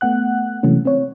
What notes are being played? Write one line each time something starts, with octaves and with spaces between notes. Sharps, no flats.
A3 B3 F#5 F#6
C3 E3 F#3 G#3 A3 C#4
C4 C#5